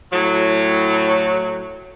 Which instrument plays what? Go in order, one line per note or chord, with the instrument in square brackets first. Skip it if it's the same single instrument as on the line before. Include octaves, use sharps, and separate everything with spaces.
[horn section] A2 F#3